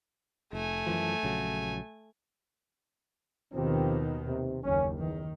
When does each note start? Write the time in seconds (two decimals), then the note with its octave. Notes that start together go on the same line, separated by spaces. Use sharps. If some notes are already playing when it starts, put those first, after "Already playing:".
0.53 F1 A3 G#5
0.87 F#2 E3 F3
1.23 A#1 C#3 F#3
3.53 D#2 B2 D#3 F3 C4 G4
4.27 C3
4.64 F#1 D#2 C#4
4.99 E2 D#3